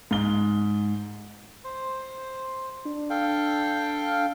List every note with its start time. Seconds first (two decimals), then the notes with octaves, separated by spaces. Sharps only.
0.11 G#2 G7
1.64 C5
2.85 D4
3.10 A4 F5 G5